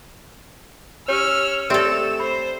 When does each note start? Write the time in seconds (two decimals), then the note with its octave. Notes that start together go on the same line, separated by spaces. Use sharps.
1.08 C#4 G4 C#5 E6 F6
1.70 A3 C4 G4 A4 D5 E5 E7
2.20 C5 B5